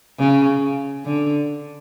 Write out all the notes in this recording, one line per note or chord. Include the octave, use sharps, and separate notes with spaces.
C#3
D3